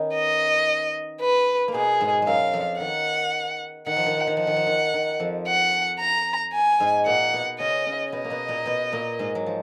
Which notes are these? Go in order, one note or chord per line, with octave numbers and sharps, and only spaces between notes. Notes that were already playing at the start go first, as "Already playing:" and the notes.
Already playing: D#3 B3 C#4 D#4
D#5
B4
A#3
B2 B3 G#4
G#2 G#3
G#3
F#2 F#3 F5
F2 F3
D#3 F#5
D#3 F#5
F3
D#3
F3
D#3
F3 F#5
D#3
F3
D#3
D#3
F2 F3
F#5
A#5
G#5
G#2 G#3
A#2 A#3 F#5
B2 B3
C#3 C#4 D#5
C#3 C#4
B2 B3 D#5
A#3
B2 B3
A#2 A#3
B2 B3
A#2 A#3
G#2 G#3
F#3
F3